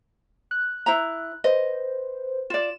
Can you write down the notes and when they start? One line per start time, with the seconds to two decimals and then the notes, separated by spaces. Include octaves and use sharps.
0.51 F#6
0.86 E4 C5 A#5
1.44 B4 C5 D#5
2.50 F4 D5 E7